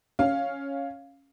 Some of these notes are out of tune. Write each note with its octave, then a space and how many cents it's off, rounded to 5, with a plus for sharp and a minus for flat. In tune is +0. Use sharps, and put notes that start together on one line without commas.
C#4 +0 F5 +0